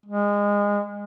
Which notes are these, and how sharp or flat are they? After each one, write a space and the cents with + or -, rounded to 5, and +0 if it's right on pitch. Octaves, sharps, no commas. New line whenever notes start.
G#3 -25